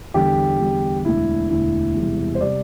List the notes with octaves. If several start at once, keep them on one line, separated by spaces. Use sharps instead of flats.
E2 D3 G3 G4
E2 D3 G3
E1 D2 D3 E4
E1 D2 D3 E4
E1 E2 C3 G3
C5
C3 G3 D5